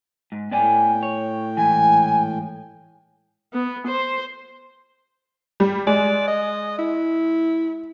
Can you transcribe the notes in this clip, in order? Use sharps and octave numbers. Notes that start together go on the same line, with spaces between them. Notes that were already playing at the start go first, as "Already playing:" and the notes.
G#2
A2 B3 D5 G5 G#5
C#5
G#2 E3 G#5
B3
C5
G3
G#3 D5
D#5
E4